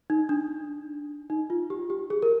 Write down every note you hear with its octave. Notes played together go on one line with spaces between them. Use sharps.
D#4
D4
D#4
F4
G4
G4
G#4
A#4